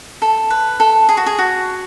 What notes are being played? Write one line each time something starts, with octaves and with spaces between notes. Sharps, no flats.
A4
B4
A4
G#4
F#4
G#4
F#4